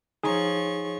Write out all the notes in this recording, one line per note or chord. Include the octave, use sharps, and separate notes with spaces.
F3 D#4 G#4 C#5 C#6